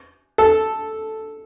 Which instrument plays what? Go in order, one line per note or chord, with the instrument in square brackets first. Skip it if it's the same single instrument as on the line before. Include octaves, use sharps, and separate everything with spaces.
[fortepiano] A4